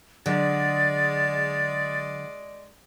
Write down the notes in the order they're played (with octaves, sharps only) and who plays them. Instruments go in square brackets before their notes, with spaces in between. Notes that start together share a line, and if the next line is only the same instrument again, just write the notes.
[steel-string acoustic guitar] D3 F#3 [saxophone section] G#3 D5 [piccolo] A6